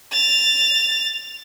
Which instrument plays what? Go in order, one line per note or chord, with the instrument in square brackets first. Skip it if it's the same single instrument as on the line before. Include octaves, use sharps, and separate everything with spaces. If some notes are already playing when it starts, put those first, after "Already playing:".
[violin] A6 F7